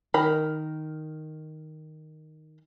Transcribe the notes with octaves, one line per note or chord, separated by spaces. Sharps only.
D#3 A#4 B5